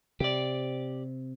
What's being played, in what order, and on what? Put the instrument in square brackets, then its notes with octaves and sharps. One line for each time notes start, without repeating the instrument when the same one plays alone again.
[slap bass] C3 [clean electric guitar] G4 D5